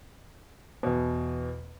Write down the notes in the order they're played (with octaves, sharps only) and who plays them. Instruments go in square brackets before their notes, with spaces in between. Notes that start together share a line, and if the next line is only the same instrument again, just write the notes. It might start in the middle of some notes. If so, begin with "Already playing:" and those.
[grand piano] E2 B2